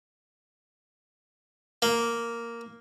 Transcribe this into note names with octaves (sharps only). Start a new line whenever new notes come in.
A#3